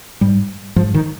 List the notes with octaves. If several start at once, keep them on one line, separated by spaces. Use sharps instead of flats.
G#2 G3
G#2 F3
D#3